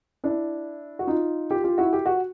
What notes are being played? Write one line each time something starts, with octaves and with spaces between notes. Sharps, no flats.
D4 E4
F#4
D#4 F4
F4 G4
F4 G4
E4 F#4
G4
F#4